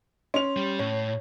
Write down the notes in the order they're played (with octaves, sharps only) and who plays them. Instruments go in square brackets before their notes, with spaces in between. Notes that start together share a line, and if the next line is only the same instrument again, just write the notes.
[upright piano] C#4 F7 [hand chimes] C6
[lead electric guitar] G3
[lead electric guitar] A2 [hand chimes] C#5